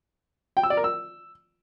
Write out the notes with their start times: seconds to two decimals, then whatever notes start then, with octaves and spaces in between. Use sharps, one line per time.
0.57 G5
0.63 E6
0.70 D5
0.77 A#4
0.84 E6